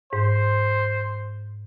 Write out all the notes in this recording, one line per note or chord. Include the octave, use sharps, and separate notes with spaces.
G#2 C5